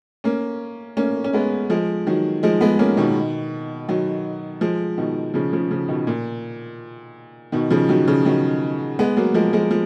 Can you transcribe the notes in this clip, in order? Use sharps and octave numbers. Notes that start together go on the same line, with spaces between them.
A#3 C#4
A#3 C#4
C#4
G#3 B3
F3 G#3
D#3 F#3
F3 G#3
G#3 B3
A#3 C#4
B2 D#3
D#3 F#3
F3 G#3
B2 D#3
C#3 F3
C#3 F3
C#3 F3
B2 D#3
A#2
B2 D#3
C#3 F3
D#3 F#3
C#3 F3
D#3 F#3
G#3 B3
F#3 A#3
F3 G#3
F3 G#3
F3